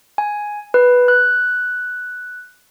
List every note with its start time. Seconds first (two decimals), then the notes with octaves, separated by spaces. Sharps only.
0.18 G#5
0.74 B4
1.08 F#6